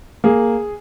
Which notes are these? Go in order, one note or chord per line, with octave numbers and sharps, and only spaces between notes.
A#3 G#4